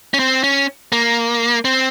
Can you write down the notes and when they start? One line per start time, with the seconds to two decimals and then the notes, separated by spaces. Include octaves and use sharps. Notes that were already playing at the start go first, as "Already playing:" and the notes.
0.14 C#4
0.19 C4
0.44 C#4
0.92 A#3
1.65 C4